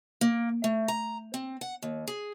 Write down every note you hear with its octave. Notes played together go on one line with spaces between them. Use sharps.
A#3
A3
A#5
C4
F#5
D#2
G#4